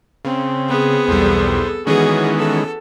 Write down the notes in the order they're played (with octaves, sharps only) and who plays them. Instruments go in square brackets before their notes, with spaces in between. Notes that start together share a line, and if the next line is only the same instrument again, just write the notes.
[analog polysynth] C#3 [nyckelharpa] C4
[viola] B3 G#4
[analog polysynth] B1 E2 G3 [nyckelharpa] A4 [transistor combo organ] C5
[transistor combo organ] D#3 G#3 [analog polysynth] E3 B3 C#4 [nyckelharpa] F#4 [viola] G#4
[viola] A4